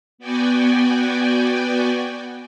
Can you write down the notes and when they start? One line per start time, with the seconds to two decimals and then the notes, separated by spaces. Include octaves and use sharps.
0.18 B3 F#4 D5 G5 G#5